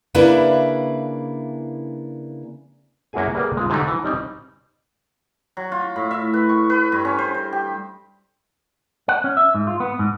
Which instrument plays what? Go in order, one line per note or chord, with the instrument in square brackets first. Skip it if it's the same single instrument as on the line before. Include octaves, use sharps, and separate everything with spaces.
[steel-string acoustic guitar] C#3 A#3 D4 E4 B4
[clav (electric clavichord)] F#2 A#3 E4 F#4 G#4 G#5
G3 A#3 G#4 B4 D5
G#3 C4 F4 G#4
G#2 D3 F#3 G3 A3 D#4
E3
G3 C4 C#4 D#4
[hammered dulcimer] F#3
F4
A2
E5
B4
C#6
B4
G2
C#4
C5
C5
G4
[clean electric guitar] F#5
C#4
E5
G#2
F4
B3
G#2